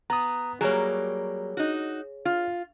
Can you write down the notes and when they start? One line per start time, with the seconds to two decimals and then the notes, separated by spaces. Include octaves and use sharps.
0.10 B3 A#5 D#6
0.61 F#3 G3 A#3 G#4 C#5
1.57 D#4 F#4
2.25 F4